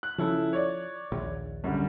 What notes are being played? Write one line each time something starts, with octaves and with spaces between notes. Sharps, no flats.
F#6
C#3 F3 E4 A4
C#5 D5
A#1 D#2
F#2 D3 G3